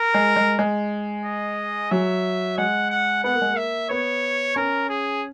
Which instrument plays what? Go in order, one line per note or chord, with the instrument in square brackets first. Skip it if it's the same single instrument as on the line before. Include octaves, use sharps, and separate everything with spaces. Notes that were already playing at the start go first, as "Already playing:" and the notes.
Already playing: [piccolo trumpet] A#4
[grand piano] G#3
G#3
G#3
[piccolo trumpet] D#5
[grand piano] F#3 [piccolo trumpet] E5
[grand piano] G#3 [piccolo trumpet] F#5
[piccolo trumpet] F#5
[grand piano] B3 [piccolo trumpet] F#5
[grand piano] A#3
G#3
A#3
[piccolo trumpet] E5
[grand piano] B3 [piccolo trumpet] C#5
[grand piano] C#4 [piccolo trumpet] A#4
[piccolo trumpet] G#4